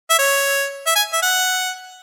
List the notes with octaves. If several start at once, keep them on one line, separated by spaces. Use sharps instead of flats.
E5
C#5
E5
G#5
E5
F#5